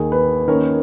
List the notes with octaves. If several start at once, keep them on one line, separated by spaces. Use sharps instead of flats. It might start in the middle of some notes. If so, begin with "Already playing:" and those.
Already playing: D#2 D#3 A#3 G#4
B4
D#3 A#3 C#4 A#4